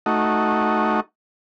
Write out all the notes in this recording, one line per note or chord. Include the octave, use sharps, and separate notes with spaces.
A3 D#4 F#4